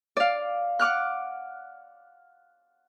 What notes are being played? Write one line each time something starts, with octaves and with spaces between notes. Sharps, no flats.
D5 F5
F#5 D6 F6 F#6